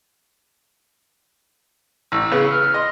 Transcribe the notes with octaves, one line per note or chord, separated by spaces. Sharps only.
A1 E6
C#3 B3 G#4 B4
F6
D#5 C6